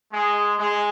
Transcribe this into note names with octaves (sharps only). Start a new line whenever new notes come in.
G#3
G#3